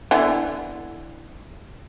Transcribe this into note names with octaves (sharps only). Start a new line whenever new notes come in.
D3 E3 B3